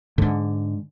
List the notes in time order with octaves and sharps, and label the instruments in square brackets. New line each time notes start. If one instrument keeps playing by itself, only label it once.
[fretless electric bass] G#2 D3